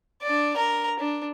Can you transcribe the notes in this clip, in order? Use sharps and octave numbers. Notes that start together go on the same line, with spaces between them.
D4 D5
A#4 A#5
D4